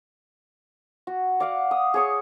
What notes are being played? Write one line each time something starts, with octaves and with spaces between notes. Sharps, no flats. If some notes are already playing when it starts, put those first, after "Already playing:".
F#4
D5 F5 F#5
D#6
G#4 C#5 C#6